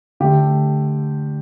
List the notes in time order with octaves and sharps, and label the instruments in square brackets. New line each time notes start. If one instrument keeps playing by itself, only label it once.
[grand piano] D3 A3 G4